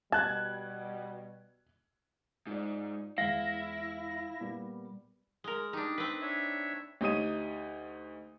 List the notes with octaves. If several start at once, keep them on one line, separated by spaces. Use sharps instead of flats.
B2 G3 A5 F#6 G#6
G#2 D#4 F4 D5
E2 G#3 E4 F5 A#6
A#2 G3 B3
G#3 A#4
D4 D#4 G4
C4 B4
D4 C#5 E5
D2 D#4 G4 C#5 D#6 D#7